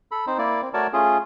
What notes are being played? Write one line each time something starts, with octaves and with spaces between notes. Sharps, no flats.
A4 B5
C4 D#4 C5
A#3 E4 D5
C4
A3 F#4 A#4 C#5 D5 A5
A3 C#4 F4 G#4